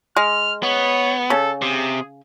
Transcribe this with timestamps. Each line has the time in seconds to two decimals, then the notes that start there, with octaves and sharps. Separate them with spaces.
0.16 G#3 F6
0.63 B3 C#5
1.30 C#3 A4
1.62 C3 G#4